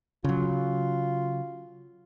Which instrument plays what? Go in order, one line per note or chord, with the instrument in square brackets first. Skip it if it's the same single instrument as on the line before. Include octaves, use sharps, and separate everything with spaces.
[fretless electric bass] C#3 F#3 [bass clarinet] F4